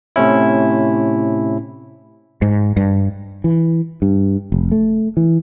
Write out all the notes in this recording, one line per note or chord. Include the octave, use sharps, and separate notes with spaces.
A2 C3 C#4 E4
G#2
G2
E3
G2
F1
A3
E3